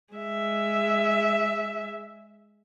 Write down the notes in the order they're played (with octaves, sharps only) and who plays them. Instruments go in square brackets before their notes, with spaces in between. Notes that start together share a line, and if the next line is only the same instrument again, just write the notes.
[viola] G#3 E5